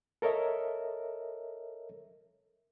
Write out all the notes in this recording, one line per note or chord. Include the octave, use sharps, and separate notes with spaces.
A4 A#4 C#5 D#5 E5